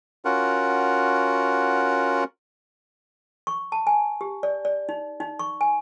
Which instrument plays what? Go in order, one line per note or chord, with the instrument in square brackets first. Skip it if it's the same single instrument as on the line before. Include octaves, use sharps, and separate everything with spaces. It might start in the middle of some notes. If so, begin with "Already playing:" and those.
[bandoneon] C#4 F4 F#4 A#4 F#5
[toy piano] C#6
A5
G#5
G4
D5
D5
D#4
D#4
C#6
G#5